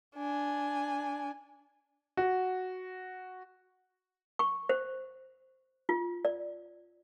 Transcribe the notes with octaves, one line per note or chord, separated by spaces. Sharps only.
D4 G#5
F#4
C#6
C5
F4
D5